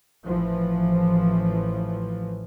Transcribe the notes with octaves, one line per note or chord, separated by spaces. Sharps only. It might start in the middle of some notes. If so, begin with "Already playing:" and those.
A1 E3 F3